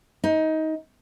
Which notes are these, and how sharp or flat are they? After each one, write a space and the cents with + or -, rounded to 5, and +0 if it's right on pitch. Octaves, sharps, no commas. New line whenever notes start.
D#4 +20